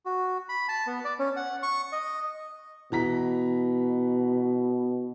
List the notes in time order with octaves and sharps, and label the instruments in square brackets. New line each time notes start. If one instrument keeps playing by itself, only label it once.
[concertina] F#4
B5
A5
B3
D5
C#4
F#5
C#6
D#5
[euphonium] B2 [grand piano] E3 A#5 B6